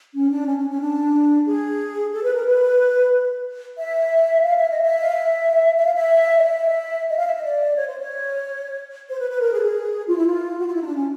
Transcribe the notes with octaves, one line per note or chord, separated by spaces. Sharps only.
C#4
D4
C#4
C#4
C#4
D4
G#4
A4
B4
A#4
B4
E5
F5
E5
D#5
E5
F5
E5
E5
F5
E5
D#5
E5
D#5
F5
E5
D#5
D5
C#5
C5
C#5
C5
B4
B4
A#4
G#4
A4
G#4
F4
E4
F4
F#4
F4
E4
D#4
D4
C#4